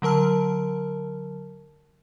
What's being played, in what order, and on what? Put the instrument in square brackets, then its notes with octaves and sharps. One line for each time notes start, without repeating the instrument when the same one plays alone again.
[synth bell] D3 F#3 A#4 A5 F6